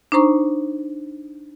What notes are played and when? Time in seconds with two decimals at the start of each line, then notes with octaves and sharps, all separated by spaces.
0.12 D4 D#4 C5 A#5 C#6